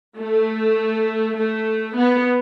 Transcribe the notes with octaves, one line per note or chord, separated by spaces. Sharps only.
A3
A3
B3